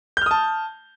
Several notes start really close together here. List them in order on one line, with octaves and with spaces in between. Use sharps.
G6 F6 D#6 A5